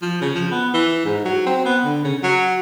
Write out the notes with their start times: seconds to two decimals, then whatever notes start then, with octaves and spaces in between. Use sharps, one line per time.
0.02 F3
0.21 C#3
0.35 F3
0.51 B3
0.74 E3
1.05 G#2
1.25 F#3
1.47 C4
1.65 B3
1.85 D3
2.05 C#3
2.23 F#3